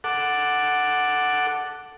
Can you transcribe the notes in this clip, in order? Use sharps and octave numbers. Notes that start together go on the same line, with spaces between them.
A4 F#5 D6